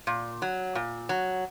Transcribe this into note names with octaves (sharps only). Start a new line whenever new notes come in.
A#2
F#3
A#2
F#3